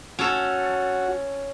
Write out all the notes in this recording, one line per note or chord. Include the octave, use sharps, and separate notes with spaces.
C#4 F#4 A4